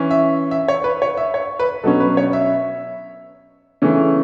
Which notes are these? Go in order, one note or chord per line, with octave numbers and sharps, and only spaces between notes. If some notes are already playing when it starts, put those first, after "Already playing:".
Already playing: E3 C#4
E5
E5
C#5
B4
C#5
E5
C#5
B4
B2 F#3 C#4 A4
B4
C#5
E5
C#3 E3 A3 C#4